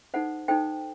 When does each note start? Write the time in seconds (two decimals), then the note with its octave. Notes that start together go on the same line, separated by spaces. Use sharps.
0.14 D#4 A4 C5 F#5
0.48 D#4 A4 C5 G5